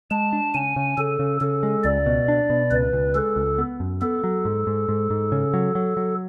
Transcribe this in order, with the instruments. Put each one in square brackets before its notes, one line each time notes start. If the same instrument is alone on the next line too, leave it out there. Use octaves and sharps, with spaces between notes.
[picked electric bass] G#3 [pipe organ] A5
[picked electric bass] D4
[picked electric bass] C#3 [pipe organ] G#5
[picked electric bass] C#3
[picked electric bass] C#3 [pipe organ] A4
[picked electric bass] C#3
[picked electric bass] C#3 [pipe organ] A4
[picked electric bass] G#3
[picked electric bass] C#2 [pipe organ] D5
[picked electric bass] B2
D4
B2
[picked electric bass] C#2 [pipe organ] B4
[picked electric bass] C#2
[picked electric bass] G#3 [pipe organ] A4
[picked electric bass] C#2
B3
F#2
[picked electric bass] B3 [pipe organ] A4
[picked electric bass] F#3
G#2
G#2
G#2
G#2
C#3
F#3
F#3
F#3